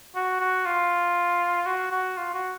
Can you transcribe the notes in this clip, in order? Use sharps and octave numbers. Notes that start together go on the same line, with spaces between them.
F#4
F#4
F4
F#4
F#4
F4
F#4